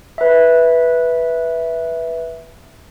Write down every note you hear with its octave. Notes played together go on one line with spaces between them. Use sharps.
B4 E5